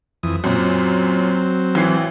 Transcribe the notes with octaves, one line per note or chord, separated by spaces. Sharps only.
F2 E3 D#6
F#2 A#2 F#3 C4
A1 E3 C7